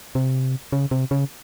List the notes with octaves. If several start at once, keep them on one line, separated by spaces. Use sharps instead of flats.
C3
C#3
C3
C#3